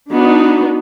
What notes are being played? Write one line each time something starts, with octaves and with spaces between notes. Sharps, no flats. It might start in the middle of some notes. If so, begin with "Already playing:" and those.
B3 D4 D#4 F#4